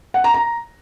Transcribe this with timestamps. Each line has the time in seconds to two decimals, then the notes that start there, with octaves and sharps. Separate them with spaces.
0.14 F#5
0.24 A#5
0.34 A#5